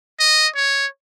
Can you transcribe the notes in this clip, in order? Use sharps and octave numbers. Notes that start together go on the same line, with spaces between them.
D#5
C#5